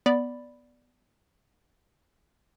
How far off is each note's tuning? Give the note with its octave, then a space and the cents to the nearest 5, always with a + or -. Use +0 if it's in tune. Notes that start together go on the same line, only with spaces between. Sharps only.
B3 +0 D5 +0 B5 +0